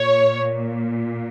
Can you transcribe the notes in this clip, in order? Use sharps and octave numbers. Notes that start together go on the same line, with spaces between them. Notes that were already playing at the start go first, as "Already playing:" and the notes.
Already playing: A#2 C#5